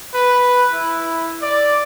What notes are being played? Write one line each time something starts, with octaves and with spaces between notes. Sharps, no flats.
B4
E4
D5